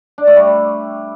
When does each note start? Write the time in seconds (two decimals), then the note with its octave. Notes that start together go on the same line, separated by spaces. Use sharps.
0.18 D4
0.27 A3
0.36 G3